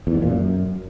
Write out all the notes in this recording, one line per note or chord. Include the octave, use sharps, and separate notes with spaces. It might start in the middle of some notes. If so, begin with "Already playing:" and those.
E2
G#2
A#2
F#2